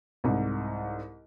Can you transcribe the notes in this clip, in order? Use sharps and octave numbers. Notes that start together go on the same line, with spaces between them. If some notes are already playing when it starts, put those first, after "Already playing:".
C2 G#2